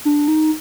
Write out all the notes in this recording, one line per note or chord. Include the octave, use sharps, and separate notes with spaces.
D4
D#4